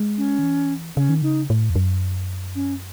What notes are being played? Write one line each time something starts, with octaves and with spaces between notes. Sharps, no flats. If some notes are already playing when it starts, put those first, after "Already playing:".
Already playing: G#3
C#4
D#3
E3
C#3 C#4
D#3
C#3 D#4
A2
E2
F#2
C#4